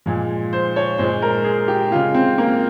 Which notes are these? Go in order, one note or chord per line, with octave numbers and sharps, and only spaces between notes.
A#2 F3 G#3
C5
C#5
A#2 G#3 C5
A#4
G#4
G4
C#3 G#3 F4
C4
A#3